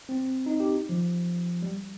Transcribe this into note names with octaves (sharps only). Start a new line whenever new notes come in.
C4
D#4
G4
F3
G3